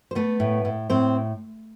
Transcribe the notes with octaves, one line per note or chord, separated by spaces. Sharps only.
C5
A3 B3 B4
A2
A2
A2 C4 C5